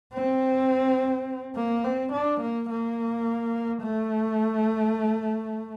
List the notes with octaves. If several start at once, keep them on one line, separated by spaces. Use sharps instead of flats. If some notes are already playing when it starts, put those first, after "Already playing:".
C4
A#3
C4
D4
A#3
A#3
A3